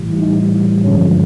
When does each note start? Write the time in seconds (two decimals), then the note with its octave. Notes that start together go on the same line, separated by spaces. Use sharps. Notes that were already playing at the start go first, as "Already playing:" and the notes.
Already playing: A2 E3 G3
0.12 E4
0.19 D#4
0.84 G2 D3 F3 G#3 C#4